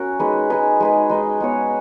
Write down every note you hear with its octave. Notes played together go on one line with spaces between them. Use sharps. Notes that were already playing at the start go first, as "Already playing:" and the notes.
Already playing: C#4 F#4 A#4
G#3 D#4 G#4 B4
G#3 D#4 G#4 B4
G#3 D#4 G#4 B4
G#3 D#4 G#4 B4
G#3 B3 F#4 C#5